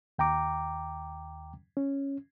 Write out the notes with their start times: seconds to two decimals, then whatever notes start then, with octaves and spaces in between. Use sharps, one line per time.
0.19 D#2 G5 A#5 D6
1.77 C#4